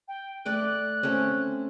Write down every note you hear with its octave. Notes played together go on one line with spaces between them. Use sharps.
G5
A3 D5 G5 F#6
A3 C4 C#4